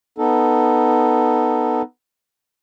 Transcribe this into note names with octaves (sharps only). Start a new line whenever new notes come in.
B3 D#4 A4